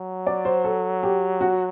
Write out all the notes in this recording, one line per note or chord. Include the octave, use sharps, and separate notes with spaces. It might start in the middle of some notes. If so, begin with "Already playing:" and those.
Already playing: F#3
D5
C5
A4
G4
F#4